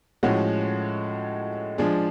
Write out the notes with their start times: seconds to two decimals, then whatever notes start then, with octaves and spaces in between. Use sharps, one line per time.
0.23 A2 F3 G#3 C#4 F#4
1.78 F3 G#3 D4 G#4